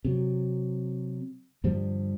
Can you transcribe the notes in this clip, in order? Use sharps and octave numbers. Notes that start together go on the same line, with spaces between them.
C3 F#3
G2 D3 F3 G3